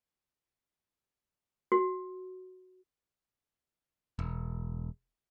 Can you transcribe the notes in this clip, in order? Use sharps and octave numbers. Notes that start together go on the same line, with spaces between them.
F#4
E1